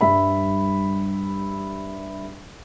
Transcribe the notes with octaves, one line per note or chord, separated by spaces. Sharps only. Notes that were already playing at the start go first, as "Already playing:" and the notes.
G2 G3 E5 B5